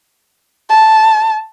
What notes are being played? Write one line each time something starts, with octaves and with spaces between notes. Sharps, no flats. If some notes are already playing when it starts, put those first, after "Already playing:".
A5